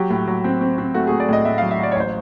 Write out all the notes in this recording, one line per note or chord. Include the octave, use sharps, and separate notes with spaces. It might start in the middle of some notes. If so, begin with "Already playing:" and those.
Already playing: F#3 G4
A2
F#3
C4
C4
C4
A3 F#4
A3 G#4
D5
A2 D#5
A2 E5
F#3 F5
E5
F#3 D5
C#5
A1 C5